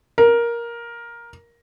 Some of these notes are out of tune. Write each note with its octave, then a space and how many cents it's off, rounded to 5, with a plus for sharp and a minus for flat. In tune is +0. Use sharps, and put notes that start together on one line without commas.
A#4 +10